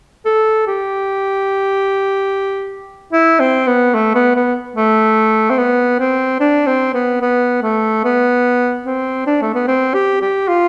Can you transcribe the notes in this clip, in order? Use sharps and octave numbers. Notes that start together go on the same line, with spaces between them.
A4
G4
E4
C4
B3
A3
B3
B3
A3
C4
B3
C4
D4
C4
B3
B3
A3
B3
C4
D4
A3
B3
C4
G4
G4
F4